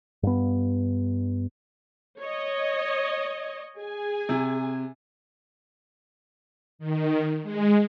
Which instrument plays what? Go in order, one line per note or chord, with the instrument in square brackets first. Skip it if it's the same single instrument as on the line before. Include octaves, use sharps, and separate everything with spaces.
[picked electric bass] G2 B3
[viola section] C#5 D#5
G#4 G#5
[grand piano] C3
[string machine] D#3
G#3